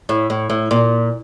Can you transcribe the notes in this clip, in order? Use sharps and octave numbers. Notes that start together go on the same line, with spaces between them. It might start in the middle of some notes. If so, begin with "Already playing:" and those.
A2
A2
A2
A#2